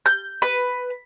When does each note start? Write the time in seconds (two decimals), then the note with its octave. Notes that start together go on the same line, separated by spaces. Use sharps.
0.06 G6
0.42 B4